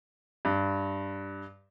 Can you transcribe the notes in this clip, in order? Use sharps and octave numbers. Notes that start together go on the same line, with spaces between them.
G2